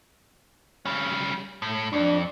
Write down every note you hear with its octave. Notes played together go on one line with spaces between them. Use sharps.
G3 C#4
A2
F2 D4